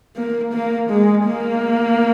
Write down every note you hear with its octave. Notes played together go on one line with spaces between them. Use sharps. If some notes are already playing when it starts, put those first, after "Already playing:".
A#3
A#3
G#3
A#3